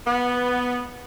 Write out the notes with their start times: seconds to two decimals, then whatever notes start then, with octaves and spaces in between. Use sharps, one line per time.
0.06 B3